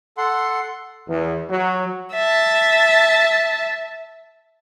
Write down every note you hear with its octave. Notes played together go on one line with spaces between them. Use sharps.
A4 F#5 C6
E2
F#3
E5 A5